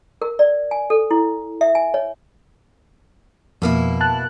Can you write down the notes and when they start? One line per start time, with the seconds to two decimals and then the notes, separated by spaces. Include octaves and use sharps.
0.22 A#4
0.39 D5
0.71 G#5
0.90 A4
1.11 E4
1.61 E5
1.75 G#5
1.94 C#5
3.62 F2 B2 A#3 E4
4.01 A5 F#6